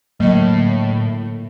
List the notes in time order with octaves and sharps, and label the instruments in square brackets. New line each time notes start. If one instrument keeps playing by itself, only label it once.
[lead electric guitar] A2 [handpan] D3 A3 A#3 [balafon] F#3 D#5